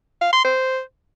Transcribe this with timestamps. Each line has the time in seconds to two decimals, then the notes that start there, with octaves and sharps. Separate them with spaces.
0.21 F5
0.33 C6
0.44 C5